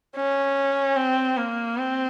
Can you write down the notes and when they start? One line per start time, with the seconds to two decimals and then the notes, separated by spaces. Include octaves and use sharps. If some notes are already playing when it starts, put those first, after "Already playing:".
0.16 C#4
0.97 C4
1.37 A#3
1.78 C4